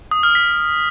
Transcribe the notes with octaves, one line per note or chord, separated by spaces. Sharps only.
D#6
F6
B6